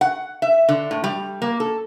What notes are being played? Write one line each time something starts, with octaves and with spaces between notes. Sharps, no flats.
F#5
E5
D3
A2
G3
A#3
A4